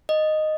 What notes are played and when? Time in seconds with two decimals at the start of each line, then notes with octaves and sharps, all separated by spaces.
0.09 D#5